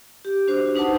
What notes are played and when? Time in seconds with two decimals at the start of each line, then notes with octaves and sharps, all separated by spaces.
0.25 G4
0.48 D4 F#4 C5
0.75 D4 D#4 B4 C5 F#5 A5